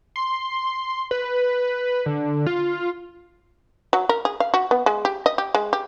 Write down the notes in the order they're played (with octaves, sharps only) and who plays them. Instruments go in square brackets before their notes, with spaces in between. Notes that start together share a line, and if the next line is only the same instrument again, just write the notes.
[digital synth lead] C6
B4
D3
F4
[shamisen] F#3
A#4
G#4
F5
F#4
B3
G#3
G4
D#5
G4
G#3
G4